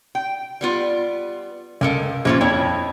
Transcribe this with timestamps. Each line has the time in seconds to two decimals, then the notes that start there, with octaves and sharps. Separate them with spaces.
0.15 G5
0.61 G3 B3 F4
1.81 C#2 A4 A#4 G#5
2.25 A#1 C#3 F3 A#3 C#4 F4
2.41 F2 E4 C#5